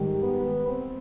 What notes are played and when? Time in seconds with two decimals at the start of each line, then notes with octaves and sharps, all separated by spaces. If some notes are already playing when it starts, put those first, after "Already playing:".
Already playing: G#2 D#3 G3
0.23 B3
0.68 C4